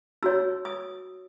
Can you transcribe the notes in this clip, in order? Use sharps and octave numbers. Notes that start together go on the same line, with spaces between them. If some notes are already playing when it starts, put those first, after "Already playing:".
D#4 F#4 C#5 E6
D#6